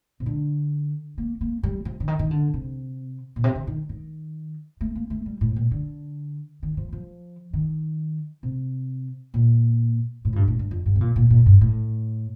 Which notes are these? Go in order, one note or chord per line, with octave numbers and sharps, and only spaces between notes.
C3
D3
A#3
A#3
G3
F3
D3
D#3
D#3
D3
C3
A#2
C3
D3
D#3
D#3
A3
A#3
A3
G3
A2
A#2
D3
D#3
F3
F3
D#3
C3
A#2
A2
F2
G2
A2
G2
F2
G2
C3
A#2
A#2
A#2
G2
A2